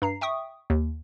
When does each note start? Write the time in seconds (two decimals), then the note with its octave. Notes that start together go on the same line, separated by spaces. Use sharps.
0.02 G2 A#5 C7
0.21 E5 G5 C#6 D#6
0.70 D#2